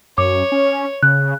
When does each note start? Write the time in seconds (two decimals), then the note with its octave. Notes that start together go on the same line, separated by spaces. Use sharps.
0.18 F#2 C#5 D6
0.52 C#4
1.03 C#3 F#6